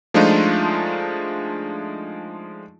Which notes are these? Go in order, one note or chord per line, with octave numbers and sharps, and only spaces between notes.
F3 G#3 A3 D4 D#4 F4